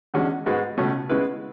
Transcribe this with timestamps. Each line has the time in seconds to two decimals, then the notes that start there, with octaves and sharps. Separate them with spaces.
0.14 E2 D3 G#3 C#4 F#4
0.46 G#2 G#3 B3 F#4 B4
0.78 C#2 B2 A3 C#4
1.09 C#3 G#3 B3 E4 B4